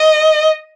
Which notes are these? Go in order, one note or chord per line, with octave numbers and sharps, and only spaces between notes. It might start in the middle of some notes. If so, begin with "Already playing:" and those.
Already playing: D#5